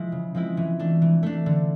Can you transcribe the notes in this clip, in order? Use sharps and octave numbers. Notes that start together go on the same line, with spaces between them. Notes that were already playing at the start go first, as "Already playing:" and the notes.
Already playing: F3 G#3 E4
C#3
F3 G#3 C4 E4
E3
A3 D4
E3
A3 D4
D3